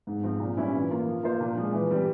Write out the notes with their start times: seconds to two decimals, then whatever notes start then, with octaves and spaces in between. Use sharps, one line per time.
0.07 G#2
0.24 F3 C4 F4
0.40 A#2
0.57 G3 C#4 E4
0.73 E3
0.91 A#3 F4
1.06 F3
1.23 A#3 F4 C5
1.41 A#2
1.57 F3 G#3
1.73 E3
1.91 G3 C4 G4